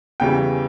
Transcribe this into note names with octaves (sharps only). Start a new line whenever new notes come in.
E2 C#3 E3 G3 G5